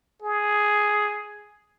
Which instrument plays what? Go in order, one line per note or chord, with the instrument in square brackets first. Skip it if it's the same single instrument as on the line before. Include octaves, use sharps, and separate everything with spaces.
[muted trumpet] G#4